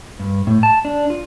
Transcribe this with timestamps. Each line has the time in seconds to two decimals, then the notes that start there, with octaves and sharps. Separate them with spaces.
0.19 G2
0.47 A2
0.63 A5
0.85 D4
1.10 F4